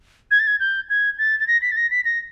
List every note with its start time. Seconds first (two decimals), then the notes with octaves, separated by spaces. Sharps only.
0.31 G#6
0.39 A6
0.47 G#6
0.60 G6
0.90 G#6
1.18 A6
1.40 A6
1.47 A#6
1.62 B6
1.72 A6
1.77 A#6
1.91 B6
2.05 A#6